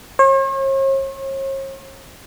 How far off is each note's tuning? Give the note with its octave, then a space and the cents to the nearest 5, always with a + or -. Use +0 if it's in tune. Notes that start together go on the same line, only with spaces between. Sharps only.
C#5 -45